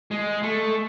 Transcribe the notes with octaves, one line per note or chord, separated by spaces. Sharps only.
G#3
A3